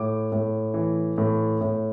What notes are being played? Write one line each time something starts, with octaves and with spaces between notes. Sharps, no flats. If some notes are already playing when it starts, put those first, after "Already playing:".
Already playing: A2 D6
A2
E3
A2
A2